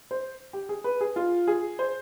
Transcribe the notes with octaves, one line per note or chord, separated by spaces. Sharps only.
C5
G4
G#4
B4
G#4
F4
G#4
C5